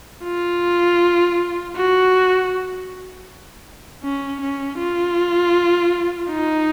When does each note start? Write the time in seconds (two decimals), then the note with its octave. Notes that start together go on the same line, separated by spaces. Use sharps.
0.24 F4
1.76 F#4
4.03 C#4
4.41 C#4
4.79 F4
6.30 D#4